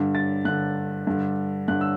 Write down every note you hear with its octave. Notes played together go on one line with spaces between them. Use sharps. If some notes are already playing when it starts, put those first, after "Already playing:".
Already playing: G2 D3
A6
G2 D3 F#6
G2 D3
G2 D3 F#6
E6